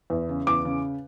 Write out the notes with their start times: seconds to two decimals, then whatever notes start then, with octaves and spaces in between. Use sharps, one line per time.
0.10 E2
0.29 C#3
0.47 E2 D6
0.65 C#3